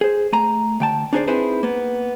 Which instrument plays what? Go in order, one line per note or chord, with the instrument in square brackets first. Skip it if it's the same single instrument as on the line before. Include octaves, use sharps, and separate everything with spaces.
[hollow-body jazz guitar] G#4 C5
A3 G#5 A#5
D2 G5 A5
D4 D#4 G#4 A4 C5 D5
C4 D#4 E4 G#4 B4 C5
A#3 B3